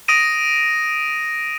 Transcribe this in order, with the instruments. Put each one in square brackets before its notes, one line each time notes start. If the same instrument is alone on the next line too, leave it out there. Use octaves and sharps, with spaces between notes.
[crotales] D#6 A#6 D7 D#7